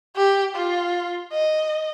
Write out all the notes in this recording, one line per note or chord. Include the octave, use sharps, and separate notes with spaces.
G4
F4
D#5